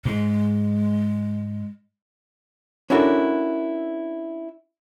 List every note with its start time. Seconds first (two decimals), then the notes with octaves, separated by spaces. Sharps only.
0.05 G#2 G#3
2.90 C#4 D4 E4 F#4 A4 A#4